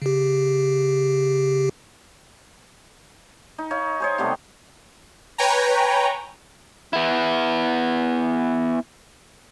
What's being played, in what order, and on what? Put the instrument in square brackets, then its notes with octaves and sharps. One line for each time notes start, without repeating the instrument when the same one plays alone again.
[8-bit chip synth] C#3 G4
[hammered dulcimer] D#4
D#4 C#5 F5
G#4 C5 C#5
C3 G3 A3 B3
[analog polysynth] B4 C#5 G5 G#5 A#5
[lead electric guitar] B3 E4